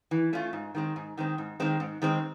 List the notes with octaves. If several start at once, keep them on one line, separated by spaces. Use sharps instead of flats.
E3
A3 C#4 F4
G#2
D#3 G#3 C4
G#2
D#3 G#3 C4
G#2
D#3 G#3 C4
G#2
D#3 G#3 C4